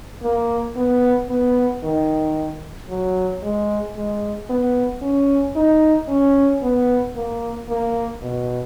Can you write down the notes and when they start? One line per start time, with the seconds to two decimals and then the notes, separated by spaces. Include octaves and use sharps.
0.23 A#3
0.77 B3
1.29 B3
1.83 D#3
2.89 F#3
3.43 G#3
3.96 G#3
4.50 B3
5.02 C#4
5.56 D#4
6.09 C#4
6.63 B3
7.16 A#3
7.69 A#3
8.22 B2